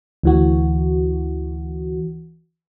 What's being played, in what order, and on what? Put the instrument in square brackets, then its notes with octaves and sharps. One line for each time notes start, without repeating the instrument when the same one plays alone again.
[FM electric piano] D2 E3 F#4